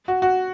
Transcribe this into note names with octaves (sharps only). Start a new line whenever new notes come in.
F#4
F#4